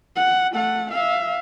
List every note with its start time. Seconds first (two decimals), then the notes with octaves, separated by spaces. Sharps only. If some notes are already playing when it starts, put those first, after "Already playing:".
0.16 F#5
0.52 A3 F#5
0.92 E5 F5